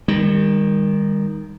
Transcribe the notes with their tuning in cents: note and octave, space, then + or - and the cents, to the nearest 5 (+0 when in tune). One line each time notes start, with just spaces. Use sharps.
D#3 +0 G3 +45